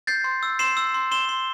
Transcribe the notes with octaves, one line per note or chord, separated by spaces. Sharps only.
G6 A6 C7
C6
E6
C6 C7 E7
E6
C6
C6 E7 G7
C6